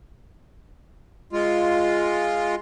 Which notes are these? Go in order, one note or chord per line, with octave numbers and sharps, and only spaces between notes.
G#3 F4